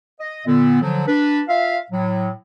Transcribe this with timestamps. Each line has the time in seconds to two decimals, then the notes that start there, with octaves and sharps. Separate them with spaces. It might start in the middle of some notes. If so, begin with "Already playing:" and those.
0.20 D#5
0.47 A#2 D3 B3
0.81 D3 F3 F#3
1.07 D4 B4
1.48 F4 E5 F5
1.91 A2 F#3